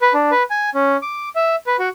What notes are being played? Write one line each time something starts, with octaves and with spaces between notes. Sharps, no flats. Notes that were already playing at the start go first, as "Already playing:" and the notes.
B4
D4
B4
G#5
C#4
D6
E5
B4
F#4